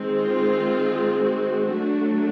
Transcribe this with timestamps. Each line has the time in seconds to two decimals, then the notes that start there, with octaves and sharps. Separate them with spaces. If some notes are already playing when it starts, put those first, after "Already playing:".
Already playing: D#3 G#3 C4
0.18 F4
1.21 F#4
1.72 F#3 A3 D4